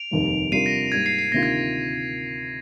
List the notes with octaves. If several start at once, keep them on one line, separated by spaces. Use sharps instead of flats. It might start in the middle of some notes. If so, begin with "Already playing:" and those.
Already playing: D7 F7
F1 D#2 D#3 G3
C3 G3 D4 F4 A#4 C7 D#7
A#6 D7
G#2 G3 A#3 G#6
C7
C7
D2 C3 D#3 A#3 F4 A#6
G#6